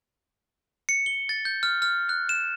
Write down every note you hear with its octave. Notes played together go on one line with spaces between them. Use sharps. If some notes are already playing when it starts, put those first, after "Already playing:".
C#7
G7
A6
G6
F6
F6
F#6
E7